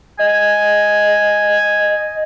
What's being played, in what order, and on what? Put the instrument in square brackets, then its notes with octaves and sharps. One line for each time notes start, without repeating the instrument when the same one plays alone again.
[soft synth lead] D#5 [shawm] G#5